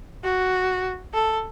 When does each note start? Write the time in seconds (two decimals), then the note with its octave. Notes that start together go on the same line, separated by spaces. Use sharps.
0.24 F#4
1.14 A4